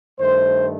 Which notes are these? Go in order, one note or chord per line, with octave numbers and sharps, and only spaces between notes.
G2 D#3 A3 C5